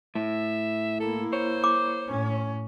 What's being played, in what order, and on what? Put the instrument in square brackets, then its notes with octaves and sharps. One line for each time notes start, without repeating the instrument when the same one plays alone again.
[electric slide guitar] A2 [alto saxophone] E5
[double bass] A#3 E4 [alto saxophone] A4
[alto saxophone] C5 [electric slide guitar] C#5
[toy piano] D6
[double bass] A2 C#4